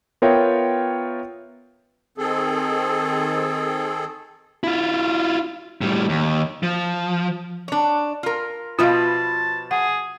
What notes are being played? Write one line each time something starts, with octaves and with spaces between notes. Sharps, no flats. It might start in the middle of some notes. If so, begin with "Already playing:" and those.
B3 F4 A#4 C#5 E5 G5
D#3 C4 G#4 A4
E4 F4
A2 G3
D#2
F3
D4 C#5
F4 A#4
B2 F3 F4 B4 E5 F5 A5
G#4 F#5